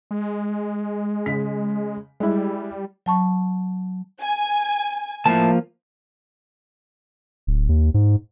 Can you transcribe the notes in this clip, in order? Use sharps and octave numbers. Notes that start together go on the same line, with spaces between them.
G#3
C#3 B6
G3 G#3 E4
F#3 A5 C#6
G#5
A2 F3 A#3 A5
D1
D#2
G#2